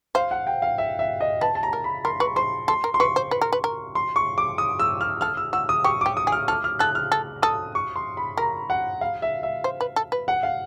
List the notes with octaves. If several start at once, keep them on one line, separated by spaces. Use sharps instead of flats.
C5 F5
F#5
G5
F5
E5
E5
D#5
B4 A5
A5
A#5
A#4
B5
A#4 C6
B4 C#6
C5 C6
A4 C6
A#4
C6
B4 C#6
C5
B4
A#4
B4
A#4
C6
C#6
D6
D#6
E6
F6
A4 F6
E6
F#4 E6
D#6
G4 C#6
G4 D6
D#6
G#4
F6
A4 F6
F6
A4 F#6
F6
A4
A4 D#6
C#6
C6
B5
A#4 A#5
F#5
F5
E5
E5
C5
B4
A4
B4
F#5
F5